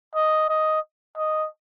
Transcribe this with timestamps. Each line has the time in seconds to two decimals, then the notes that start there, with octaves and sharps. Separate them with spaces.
0.15 D#5
0.49 D#5
1.17 D#5